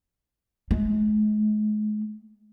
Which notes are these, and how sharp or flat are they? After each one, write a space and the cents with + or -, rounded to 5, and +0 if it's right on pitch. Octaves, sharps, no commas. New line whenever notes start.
G#3 +40